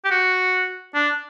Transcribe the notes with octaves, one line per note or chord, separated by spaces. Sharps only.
G4
F#4
D4